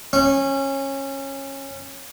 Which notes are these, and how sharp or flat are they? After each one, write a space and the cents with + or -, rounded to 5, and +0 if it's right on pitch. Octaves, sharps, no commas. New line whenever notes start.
C#4 -20